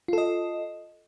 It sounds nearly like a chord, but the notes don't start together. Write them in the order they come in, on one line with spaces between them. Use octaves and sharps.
F4 A4 D#5